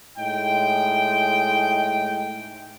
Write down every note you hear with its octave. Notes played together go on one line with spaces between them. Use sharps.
A2 G#3 D#4 G5